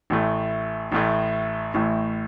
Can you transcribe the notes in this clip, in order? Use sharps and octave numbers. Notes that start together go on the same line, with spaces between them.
A1 A2 A3
A1 A2 A3
A1 A2 A3